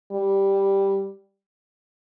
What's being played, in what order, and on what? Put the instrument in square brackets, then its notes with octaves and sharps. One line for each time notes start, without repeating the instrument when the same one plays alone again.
[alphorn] G3